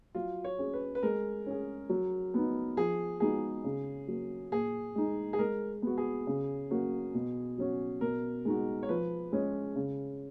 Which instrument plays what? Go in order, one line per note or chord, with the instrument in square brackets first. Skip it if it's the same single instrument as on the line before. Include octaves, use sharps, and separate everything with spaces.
[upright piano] F#3 [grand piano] F4
[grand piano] C#5
[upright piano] C#4 G#4
[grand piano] B4
B4
[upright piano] G#3 [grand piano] A#4
[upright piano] C#4 G#4
F#3
B3 D#4
[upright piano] F3 [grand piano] G#4
[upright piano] G#3 B3 D#4 F#4 [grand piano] G#4
[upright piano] C#3
F#3 A#3
[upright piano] A#2 [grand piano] G#4
[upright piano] G#3 D#4
[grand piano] G#4
[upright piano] G#3 [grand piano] A#4
[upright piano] B3 F#4
[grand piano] G#4
[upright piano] C#3
F#3 A#3 C#4 F#4
B2
F#3 C#4 F#4
[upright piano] B2 [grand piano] A#4
[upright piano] G#3 D#4 F#4
[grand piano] C#5
[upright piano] F3 [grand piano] B4
[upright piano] G#3 C#4 G#4
C#3